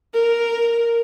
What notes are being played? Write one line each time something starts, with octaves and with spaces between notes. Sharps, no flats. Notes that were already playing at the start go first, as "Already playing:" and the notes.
A#4